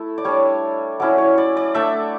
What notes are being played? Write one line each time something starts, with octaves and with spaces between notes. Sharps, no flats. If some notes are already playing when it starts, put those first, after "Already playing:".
Already playing: A3 E4
D5
G3 D4 C#5
F#3 C#4 E4 D5
C#5
D5
D5
A3 D4 E5